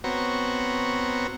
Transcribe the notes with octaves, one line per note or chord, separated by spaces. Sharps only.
B3 C4 F#4 C#5 A#5